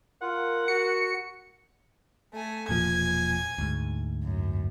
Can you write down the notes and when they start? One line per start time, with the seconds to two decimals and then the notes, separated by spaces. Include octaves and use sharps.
0.22 F4 A#4 F#5
0.68 F#4 C#7
2.33 A3 G#5
2.69 E1 A#2 F3 G#5 G#6
3.58 D2 G#2
4.24 F#2